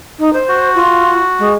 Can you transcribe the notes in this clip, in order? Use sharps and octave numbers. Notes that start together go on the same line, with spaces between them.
D#4
C5
F#4
F4
G#3